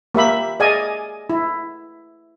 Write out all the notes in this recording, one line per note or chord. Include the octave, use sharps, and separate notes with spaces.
A#3 G4 E5 B5
G#4 D5 D#5 F5 G#5
E4